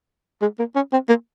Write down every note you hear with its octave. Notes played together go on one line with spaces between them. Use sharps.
G#3
A#3
C#4
C4
A#3